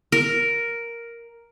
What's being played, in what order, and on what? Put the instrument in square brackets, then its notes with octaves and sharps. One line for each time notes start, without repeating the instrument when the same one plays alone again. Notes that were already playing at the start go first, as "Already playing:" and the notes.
[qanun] A#4